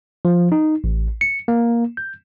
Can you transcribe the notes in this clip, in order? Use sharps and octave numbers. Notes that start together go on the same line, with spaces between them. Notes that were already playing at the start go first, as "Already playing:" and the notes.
F3
D#4
A1
C#7
A#3
G6